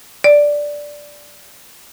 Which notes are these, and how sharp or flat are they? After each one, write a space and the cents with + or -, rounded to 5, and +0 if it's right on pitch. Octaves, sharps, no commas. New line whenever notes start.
D5 -5